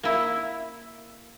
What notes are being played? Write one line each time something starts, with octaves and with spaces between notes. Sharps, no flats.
A#3 E4